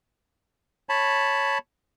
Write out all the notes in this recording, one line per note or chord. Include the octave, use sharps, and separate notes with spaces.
C#5 A5 B5